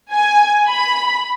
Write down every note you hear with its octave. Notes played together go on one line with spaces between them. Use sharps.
G#5
B5